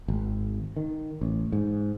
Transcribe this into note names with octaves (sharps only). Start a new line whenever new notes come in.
G#1
D#3
A1
G#2